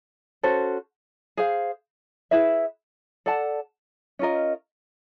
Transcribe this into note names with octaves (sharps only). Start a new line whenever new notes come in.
C#4 F#4 A4 C5
G#4 C5 F5
E4 G#4 B4 E5
A4 D5 F#5 A5
C#4 F4 A#4 D#5